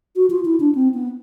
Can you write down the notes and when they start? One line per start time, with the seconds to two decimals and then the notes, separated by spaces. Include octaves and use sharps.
0.16 F#4
0.30 F4
0.45 E4
0.60 D4
0.75 C4
0.94 B3